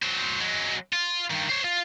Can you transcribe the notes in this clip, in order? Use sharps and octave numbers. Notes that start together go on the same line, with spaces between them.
F#3 C5
F#3 G#3
F4
G2 D#3
C5 C#5
F4